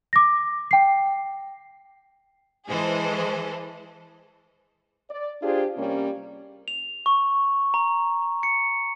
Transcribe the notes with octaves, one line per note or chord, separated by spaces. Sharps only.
D6 A#6
G5 C7
E3 G#3 G#4 A4 C5
D5
D4 F4 G4 G#4 C5
C3 G3 A#3 C#4
F7
C#6
A#5
C#7